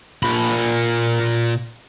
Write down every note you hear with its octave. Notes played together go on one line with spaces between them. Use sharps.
A#2 B5